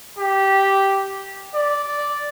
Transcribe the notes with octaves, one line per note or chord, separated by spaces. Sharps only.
G4
D5